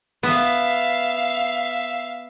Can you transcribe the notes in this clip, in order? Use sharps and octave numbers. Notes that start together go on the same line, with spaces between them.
B3 E5 F5